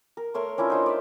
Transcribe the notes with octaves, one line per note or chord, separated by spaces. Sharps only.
A#4
A3 A#4 C#5 C6
C#4 D4 E4 F4
D#4 F4 C5
D5 E5